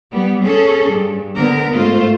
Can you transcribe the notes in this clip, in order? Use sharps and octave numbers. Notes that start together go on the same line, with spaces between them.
G3 B3
C#4 G#4 A4
G2
D3 B3 A#4
G#2 A3 F4 C5